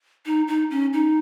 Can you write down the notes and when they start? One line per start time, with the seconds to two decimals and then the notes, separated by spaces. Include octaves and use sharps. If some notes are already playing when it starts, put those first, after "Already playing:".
0.26 D#4
0.48 D#4
0.71 C#4
0.93 D#4